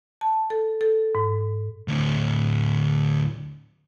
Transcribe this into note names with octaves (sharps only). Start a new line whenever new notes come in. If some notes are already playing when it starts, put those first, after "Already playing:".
A5
A4
A4
G#2
D2 A2